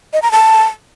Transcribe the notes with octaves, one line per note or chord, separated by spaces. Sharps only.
D#5
A#5
A5